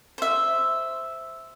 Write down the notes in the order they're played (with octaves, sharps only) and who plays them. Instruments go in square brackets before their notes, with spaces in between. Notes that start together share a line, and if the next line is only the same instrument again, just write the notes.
[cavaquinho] C5 E5